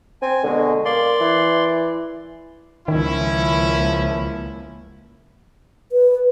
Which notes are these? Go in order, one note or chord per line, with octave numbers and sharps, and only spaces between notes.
C4 G#5
B2 D3 G#3
A#3 D5 C6
E3
C#2 D#3 F3 A#3 C#4 E4
B4